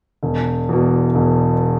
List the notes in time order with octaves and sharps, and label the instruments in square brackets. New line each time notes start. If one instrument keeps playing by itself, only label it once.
[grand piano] E1
E2 B2
E1